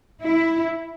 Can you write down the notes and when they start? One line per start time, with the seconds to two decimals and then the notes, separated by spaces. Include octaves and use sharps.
0.22 E4